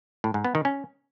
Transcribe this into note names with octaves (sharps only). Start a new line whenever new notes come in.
A2
G#2
B3
D#3
C#4